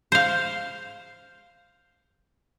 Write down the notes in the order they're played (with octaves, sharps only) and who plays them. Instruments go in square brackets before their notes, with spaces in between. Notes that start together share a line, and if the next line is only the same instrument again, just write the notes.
[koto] C5 F5